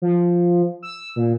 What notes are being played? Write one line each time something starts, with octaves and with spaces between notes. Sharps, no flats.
F3
E6
A#2